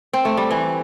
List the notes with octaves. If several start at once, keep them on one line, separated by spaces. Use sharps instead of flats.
C4
A3
G3
E3